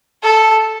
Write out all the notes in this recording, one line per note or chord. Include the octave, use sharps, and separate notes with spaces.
A4